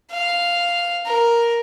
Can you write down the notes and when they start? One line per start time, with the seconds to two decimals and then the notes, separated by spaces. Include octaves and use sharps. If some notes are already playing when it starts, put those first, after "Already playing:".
0.11 F5
1.06 A#4